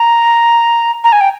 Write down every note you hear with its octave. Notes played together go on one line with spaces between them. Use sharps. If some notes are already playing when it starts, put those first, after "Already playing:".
Already playing: A#5
A#5
G#5
G5